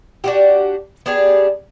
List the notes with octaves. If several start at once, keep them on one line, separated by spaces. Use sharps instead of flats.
D4 F#4 G4
B3 D4 G4 G#4